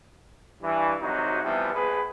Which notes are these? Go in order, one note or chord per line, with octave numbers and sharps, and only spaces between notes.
G2 E3
G#1 C3 F#3 D#4 F#4
C3 E3 F3 G3 B3
A#1 G#4 B4